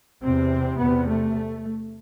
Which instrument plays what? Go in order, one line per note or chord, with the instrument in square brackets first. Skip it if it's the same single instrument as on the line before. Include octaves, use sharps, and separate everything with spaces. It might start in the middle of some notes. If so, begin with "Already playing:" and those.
[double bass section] E2 C3 C4
E2 C3 B3
A3